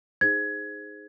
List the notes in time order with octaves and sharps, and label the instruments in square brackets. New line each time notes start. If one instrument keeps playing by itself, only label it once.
[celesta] D#4 G#4 C5 G#6